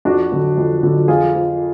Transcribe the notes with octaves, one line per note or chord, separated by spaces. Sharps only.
F2 D4 F#4
D3 F#3
F2
D3 F#3
F2 F4 G#4
F3